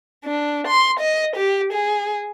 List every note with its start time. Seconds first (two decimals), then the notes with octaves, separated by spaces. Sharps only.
0.25 D4
0.67 C6
1.00 D#5
1.36 G4
1.73 G#4